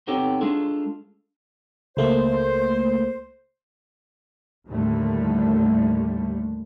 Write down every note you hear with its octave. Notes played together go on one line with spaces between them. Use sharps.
B3 C4 D#4 G4 A4 C#5
G#3 D4 F4 G#4 A4
C#2 A3 A#3 C5
D#2 A2 D3 G3 A3